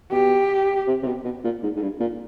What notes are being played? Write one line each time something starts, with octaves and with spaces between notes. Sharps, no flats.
B2 G4
C3
C3
B2
B2
A#2
G#2
G#2
G2
A#2